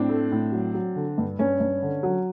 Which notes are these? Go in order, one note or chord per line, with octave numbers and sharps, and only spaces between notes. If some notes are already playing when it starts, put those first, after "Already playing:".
Already playing: A2 C4 D4
A3
A2
F#3
F#3
D3
G2
G2 C#4
G2
D3
F#3